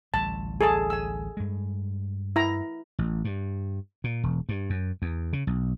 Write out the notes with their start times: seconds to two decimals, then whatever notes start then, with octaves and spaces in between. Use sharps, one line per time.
0.14 A1 D2 G3 A5
0.61 G#4 A4 A5
0.90 G#5 E6
1.37 G2 G#3
2.36 E4 A#5
2.99 A1
3.25 G2
4.04 A#2
4.23 E1
4.49 G2
4.70 F#2
5.02 E2
5.33 C#3
5.47 B1